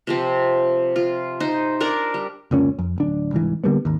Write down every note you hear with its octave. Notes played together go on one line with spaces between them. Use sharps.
C3 F3 C4
F4
D#4 C5
D4 A#4 D5
G3
F1 C#2 A#2 C#4
F2
D1 D4
C2 G#2 E3
D3 G3 A#3 B3
G#1 D#2